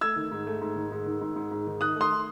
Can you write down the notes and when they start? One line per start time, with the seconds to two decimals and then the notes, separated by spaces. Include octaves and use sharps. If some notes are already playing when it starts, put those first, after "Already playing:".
0.01 A3 E6 G#6
0.16 D#3
0.31 G#2
0.47 A3
0.61 G#2
0.76 D#3
0.92 G#2
1.06 D#3
1.21 G#2
1.36 G#2
1.51 G#2
1.67 D#3
1.81 D#3 D#6 F#6
1.95 A3
2.01 C6 D#6